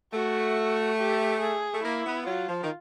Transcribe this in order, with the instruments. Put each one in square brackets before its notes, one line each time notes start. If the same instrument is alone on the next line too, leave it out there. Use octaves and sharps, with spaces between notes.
[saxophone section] A3 [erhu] F#4
[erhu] G4
G#4
[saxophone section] A3
[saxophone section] A#3 [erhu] E4
[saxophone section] B3
[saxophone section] F#3 [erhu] F4
[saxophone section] F3
D#3